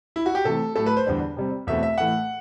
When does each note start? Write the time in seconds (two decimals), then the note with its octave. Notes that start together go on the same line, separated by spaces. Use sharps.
0.16 E4
0.26 F#4
0.35 G4
0.45 C3 E3 A3 A4
0.76 A2 F#3 A3 A4
0.86 B4
0.97 C5
1.06 E2 D3 G3 D4
1.37 C3 G3 C4
1.67 E2 B2 A3 C4 E5
1.83 E5
1.98 A2 E3 A3 F#5